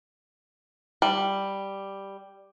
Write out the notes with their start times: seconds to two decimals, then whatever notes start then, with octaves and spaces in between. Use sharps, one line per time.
1.02 G3